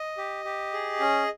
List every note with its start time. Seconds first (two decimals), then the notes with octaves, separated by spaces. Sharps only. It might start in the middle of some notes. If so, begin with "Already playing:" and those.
Already playing: D#5
0.18 G4
0.45 G4
0.73 G#4
1.00 C#4